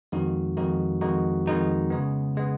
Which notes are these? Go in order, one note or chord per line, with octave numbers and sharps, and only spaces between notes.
F2 D#3 G#3 D#4 F#4
F2 D#3 G#3 D#4 F#4
F2 D#3 G#3 D#4 F#4
F2 D#3 G#3 D#4 F#4
C#3 G#3 B3
C#3 G#3 B3